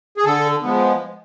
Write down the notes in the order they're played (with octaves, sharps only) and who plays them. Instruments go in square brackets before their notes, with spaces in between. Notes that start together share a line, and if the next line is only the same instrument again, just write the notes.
[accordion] G#4
D3 A4
F3 G#3 B3